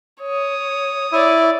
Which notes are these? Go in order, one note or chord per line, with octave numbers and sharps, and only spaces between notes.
C#5 D#6
E4 C#5 D5